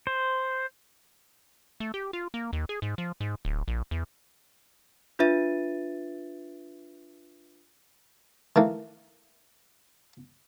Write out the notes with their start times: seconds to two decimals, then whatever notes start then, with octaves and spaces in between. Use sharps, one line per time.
0.07 C5
1.80 A3
1.94 G4
2.13 F4
2.34 A#3
2.53 D#2
2.69 G#4
2.82 G#2
2.98 F3
3.21 G#2
3.45 D1
3.68 A#1
3.91 E2
5.19 D4 F4 B4 E5 A6 D#7
8.56 D#3 E3 A3 A#3